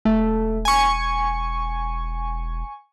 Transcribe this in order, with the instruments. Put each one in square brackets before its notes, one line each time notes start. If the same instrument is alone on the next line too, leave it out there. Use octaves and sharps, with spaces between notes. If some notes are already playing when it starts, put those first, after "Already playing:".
[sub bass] E1 [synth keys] A3
[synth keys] G#5 C#6